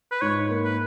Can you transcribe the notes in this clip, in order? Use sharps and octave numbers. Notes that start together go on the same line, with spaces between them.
B4
G#2 C#5
A#3
B4